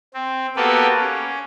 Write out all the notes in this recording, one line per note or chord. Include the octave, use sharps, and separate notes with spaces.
C4
A#3 B3 F#4 G4 A4 B4
C#4